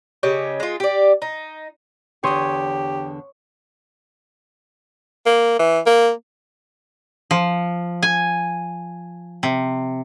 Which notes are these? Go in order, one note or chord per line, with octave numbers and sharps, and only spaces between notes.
C#3 G4 C#5 D#5
G#3 F4
G4 D5
D#4
E2 D3 G4 C#5 C6 D#6
A#3
E3
A#3
F3
G#5
C3